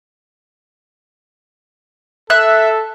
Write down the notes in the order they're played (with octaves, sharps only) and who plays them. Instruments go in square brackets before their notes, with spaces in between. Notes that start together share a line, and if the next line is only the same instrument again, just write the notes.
[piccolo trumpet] A4 [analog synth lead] E5 [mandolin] F#6